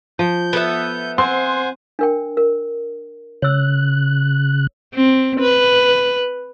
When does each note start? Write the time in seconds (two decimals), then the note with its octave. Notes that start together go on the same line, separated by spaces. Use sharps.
0.19 F3 G6
0.53 B3 A4 E5
1.18 C4 C5 F#5 G#5 C6
1.99 D4 A#4 G5
2.37 A#4
3.42 C#3 C#5 E6 F#6
4.95 C4
5.40 B4